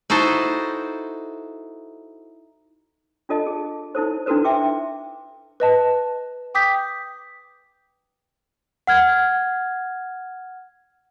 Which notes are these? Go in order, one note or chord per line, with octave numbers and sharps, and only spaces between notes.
D#4 E4 F#4 A4 C5
D4 F4 A4 D#5 A5
G#4
D#4 E4 A4 C5
D4 E4 F#4 A4 B4 C5
E5 G5 C6 D6
B4 D#5 A5
G5 D6 D#6 G6 B6
F#5 F6 G#6